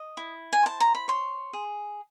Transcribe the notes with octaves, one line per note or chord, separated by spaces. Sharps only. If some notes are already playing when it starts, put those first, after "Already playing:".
Already playing: D#5
E4
G#5
C5 A5
A#5
B5
C#5 C6
G#4